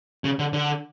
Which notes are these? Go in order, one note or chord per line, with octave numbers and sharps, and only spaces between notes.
C#3
D3
D3